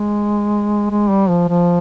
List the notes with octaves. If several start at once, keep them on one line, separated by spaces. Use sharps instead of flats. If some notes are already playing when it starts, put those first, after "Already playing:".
Already playing: G#3
G#3
G3
F3
F3